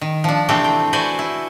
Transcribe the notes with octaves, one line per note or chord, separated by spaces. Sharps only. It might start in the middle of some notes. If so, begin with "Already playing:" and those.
D#3
F3 D4
C3 E3 A3 C4 D4 G4
G5
F#4 B4 C5 D5 G#5
E4